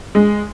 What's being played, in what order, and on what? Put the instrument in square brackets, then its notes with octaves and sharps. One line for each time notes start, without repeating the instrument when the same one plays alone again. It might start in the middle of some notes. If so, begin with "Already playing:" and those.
[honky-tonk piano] G#3